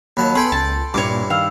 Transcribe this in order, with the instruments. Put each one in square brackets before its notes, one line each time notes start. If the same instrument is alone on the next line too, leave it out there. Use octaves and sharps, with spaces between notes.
[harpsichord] D#2 F#3 A5 [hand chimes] B5
[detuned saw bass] B3 [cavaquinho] G#4 B5 [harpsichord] A4 G5 G#5 [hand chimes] C6 G#6
[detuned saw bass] C#2 [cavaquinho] A5
[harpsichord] G2 E4 [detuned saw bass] A#2 [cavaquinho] C#5 D6
[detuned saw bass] D#3 [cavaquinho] F5 [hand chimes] G5 E6